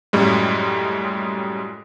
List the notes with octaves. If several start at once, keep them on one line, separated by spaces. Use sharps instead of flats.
F#2 A2 G3 G#3